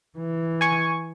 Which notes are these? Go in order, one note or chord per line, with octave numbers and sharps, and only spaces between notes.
E3
G#5 C#6